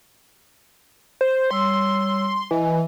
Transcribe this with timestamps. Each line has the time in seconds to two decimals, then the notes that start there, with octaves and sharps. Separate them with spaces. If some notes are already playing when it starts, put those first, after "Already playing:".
1.21 C5
1.51 G3 C#5 C6 E6
2.51 E3 D#5 G#5